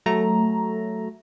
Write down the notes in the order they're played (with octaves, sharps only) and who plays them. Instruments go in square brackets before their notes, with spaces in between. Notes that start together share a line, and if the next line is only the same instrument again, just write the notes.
[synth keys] F#3 A3 A#5